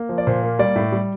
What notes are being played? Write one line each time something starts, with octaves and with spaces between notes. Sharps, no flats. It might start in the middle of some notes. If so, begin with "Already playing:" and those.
Already playing: A#3
F3
D5
A#2 C5
A#3
G3 D5
A2
G3